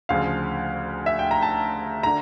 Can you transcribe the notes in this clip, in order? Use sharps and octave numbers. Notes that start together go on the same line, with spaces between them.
D2 C#3 F3 F5
E5
G5
A#5
A5
D3 A#5